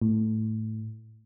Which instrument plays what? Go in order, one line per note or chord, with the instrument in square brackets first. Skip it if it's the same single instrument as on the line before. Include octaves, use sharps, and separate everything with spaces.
[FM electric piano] A2